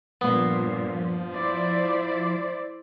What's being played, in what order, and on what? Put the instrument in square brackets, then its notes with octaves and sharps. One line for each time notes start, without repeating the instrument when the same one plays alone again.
[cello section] G2 A#2 [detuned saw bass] F3 [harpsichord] B3
[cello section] E4 C5 D5